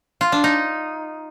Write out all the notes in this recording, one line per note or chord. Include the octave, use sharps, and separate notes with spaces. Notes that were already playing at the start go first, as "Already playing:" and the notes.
F4
D4
D#4